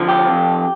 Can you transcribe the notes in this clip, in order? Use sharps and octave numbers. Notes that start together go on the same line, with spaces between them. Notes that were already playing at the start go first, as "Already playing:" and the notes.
Already playing: D3 F3
G4
F2